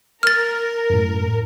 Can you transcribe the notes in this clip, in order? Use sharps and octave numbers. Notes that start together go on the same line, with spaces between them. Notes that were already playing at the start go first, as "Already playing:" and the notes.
A#4 F6 A6
F#2 A2